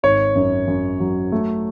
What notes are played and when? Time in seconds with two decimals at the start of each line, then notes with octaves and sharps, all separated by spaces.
0.03 G#1 C#5
0.36 F#2
0.68 F#2
1.00 F#3
1.32 A3